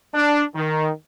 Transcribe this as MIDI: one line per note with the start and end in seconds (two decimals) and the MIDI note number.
0.14 0.42 62
0.55 0.89 51